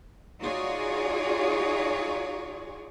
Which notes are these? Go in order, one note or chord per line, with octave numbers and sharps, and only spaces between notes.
D#4 F4 F#4 G#4 C#5 D5